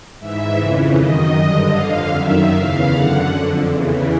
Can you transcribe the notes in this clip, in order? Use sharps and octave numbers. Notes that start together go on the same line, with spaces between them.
G#2 E3 E5
F2 C#3 E3
F#2 D#3 D#5
G2 D3 D#5
F2 D3 F5
F#2 D#3 E5
E2 C#3 E3 F5
F#2 D3 F#5
F2 D3
E2 C#3 E3